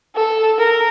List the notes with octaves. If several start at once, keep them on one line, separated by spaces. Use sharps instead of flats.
A4
A#4